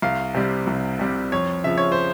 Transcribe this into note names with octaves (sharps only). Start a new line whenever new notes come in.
C2 F5
C3 G3
C2
C3 G3
F2 C#5
C#3 F3 E5
C#5
C5